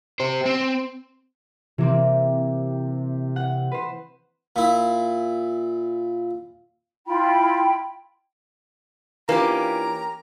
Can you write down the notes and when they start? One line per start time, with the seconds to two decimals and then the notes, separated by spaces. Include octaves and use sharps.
0.20 G4 C5
0.46 C4
1.78 C3 E3 A#3 C4
3.36 F#5
3.72 B4 C5
4.56 A#2 E4
7.07 E4 F4 G5 B5
9.29 E3 A#3 C#4 D4 F4 G4 A#5